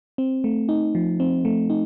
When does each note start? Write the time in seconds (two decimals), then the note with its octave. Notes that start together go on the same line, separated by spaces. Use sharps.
0.18 C4
0.44 A3
0.69 D#4
0.95 F3
1.20 C4
1.45 A3
1.70 D#4